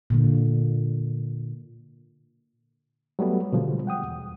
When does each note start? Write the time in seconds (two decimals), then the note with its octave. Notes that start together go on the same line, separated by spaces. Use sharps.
0.10 A#2 D3 A#3
3.19 F#3 G3 A3 B3
3.52 B2 D3 F3 G3 G#3
3.87 F#5 G5 D#6
4.03 E2